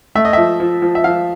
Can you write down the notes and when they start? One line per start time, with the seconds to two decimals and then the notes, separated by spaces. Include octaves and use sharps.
0.15 A3 E5
0.25 D#5
0.33 F3 E5
0.60 F3
0.82 F3
0.95 E5
1.04 F3 F5